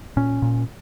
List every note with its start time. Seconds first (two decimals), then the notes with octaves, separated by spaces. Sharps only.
0.17 A#2 C#4
0.42 A#2